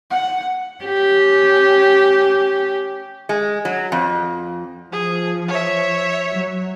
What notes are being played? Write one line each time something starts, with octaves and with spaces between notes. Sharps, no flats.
F#5
C#4 G4
G#3
F#3
F2
F3 G#4
C#5 E5
F#3